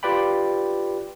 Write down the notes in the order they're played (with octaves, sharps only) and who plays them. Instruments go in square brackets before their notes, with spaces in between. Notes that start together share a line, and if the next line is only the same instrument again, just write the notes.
[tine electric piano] F4 G4 B4 D5 G5 B5